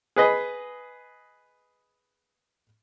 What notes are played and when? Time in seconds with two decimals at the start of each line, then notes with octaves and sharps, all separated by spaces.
0.16 G#4 B4 D#5